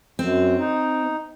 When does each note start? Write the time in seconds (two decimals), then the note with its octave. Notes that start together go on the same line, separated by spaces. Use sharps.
0.19 F#2 C4
0.59 D#4